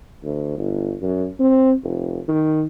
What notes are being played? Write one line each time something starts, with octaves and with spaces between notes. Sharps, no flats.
D2
G1
F#2
C4
F1
D#3